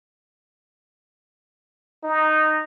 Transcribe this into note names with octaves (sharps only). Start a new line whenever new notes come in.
D#4